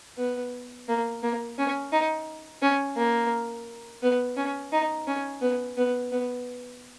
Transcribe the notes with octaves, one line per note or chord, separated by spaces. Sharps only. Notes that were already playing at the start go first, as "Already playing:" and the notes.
B3
A#3
A#3
C#4
D#4
C#4
A#3
B3
C#4
D#4
C#4
B3
B3
B3